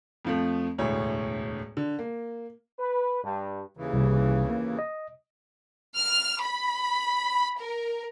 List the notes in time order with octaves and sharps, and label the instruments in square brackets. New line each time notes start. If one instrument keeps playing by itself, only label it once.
[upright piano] F2 F3 A3
E1 D2 A2 C#5
D3
A#3
[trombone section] B4
G2
[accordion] D#2 C#3 E3
[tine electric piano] C2
A#3
D#5
[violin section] F6
B5
A#4